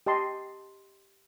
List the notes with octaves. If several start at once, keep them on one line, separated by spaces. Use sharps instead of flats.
G4 D#5 A5 C6